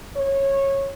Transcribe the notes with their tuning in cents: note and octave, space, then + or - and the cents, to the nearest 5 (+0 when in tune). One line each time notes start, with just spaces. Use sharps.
C#5 -15